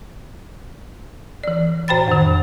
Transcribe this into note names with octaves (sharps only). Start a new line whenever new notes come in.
E3 D5
A2 C5 G5 B5 A6
F2 D#3